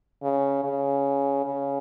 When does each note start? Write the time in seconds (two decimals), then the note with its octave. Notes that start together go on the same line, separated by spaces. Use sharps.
0.23 C#3
0.64 C#3
1.45 C#3